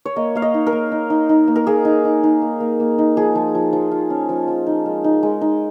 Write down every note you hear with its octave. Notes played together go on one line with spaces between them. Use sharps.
C#5
A#3 D#5
A#3 F5
D#5
D#4
A#4
A#3
D#4
D#4
D#4
A#3
A#4
A#3 G#4
D#4
D#4
D#4
A#3
A#3
A#3
D#4
F3 G#4
F3
F3
F3
F4
C#4
F3
F3
D#4
G#3
D#4
G#3
D#4